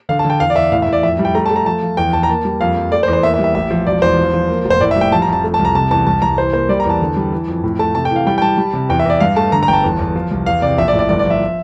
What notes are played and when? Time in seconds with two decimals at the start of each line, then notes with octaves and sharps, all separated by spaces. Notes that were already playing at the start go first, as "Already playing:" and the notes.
0.09 D3 F5
0.19 A5
0.25 D3
0.30 G5
0.40 E2 F5
0.50 D5
0.56 E2 E5
0.72 A2 F5
0.82 E5
0.88 A2 D5
1.03 F2 E5
1.19 G3
1.25 G5
1.35 A3 A#5
1.46 A5
1.51 A3
1.56 A#5
1.66 F3 A5
1.82 F3
1.97 E2 G5
2.13 E2 A5
2.23 A#5
2.29 A#3 A5
2.45 G3
2.61 F2 F5
2.76 F3
2.92 A3 D5
3.03 C5
3.08 E2
3.13 C5
3.23 A#3 E5
3.34 E5
3.39 G3
3.44 E5
3.55 A1 E5
3.71 F3
3.87 E1 D5
4.02 E2 C5
4.17 F3
4.34 F3
4.49 A#3
4.65 F1
4.70 C5
4.80 A2 D5
4.91 E5
4.96 G3
5.01 G5
5.12 F3 A5
5.22 A#5
5.28 F2 A5
5.44 A3
5.54 A5
5.59 C2
5.65 A#5
5.75 C3 A5
5.91 E2 A5
6.07 C2 A5
6.22 C2 A#5
6.38 E3 C5
6.53 A#3 C5
6.69 G3 D5
6.80 A#5
6.85 E2 A5
7.01 D3
7.16 G3
7.32 E3
7.48 F2
7.64 A2
7.79 A3 A5
7.95 C3 A5
8.05 G5
8.11 E3 F5
8.26 G3 G5
8.38 G5
8.42 G3 A5
8.58 G3
8.73 C3
8.89 E2 G5
9.00 E5
9.06 E2 D5
9.20 G2 F5
9.36 A3 A5
9.52 D3 A#5
9.63 A#5
9.68 G1 G5
9.73 A5
9.84 E2
9.99 E2
10.16 F3
10.31 C2
10.46 E2 F5
10.62 C3 D5
10.78 A#1 E5
10.88 D5
10.93 A2
10.99 D5
11.09 G1 D5
11.19 D5
11.25 F3
11.30 E5